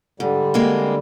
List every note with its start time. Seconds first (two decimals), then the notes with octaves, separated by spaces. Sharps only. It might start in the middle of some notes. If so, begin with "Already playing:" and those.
0.20 G#2 D3 G3
0.54 G#3 A#3 C4